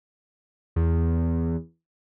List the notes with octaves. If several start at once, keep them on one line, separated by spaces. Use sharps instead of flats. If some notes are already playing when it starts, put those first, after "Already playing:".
E2